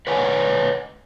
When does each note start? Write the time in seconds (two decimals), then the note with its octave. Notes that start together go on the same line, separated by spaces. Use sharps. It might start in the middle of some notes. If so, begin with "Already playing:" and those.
0.07 B4 C#5 D#5 F#5 G#5 A#5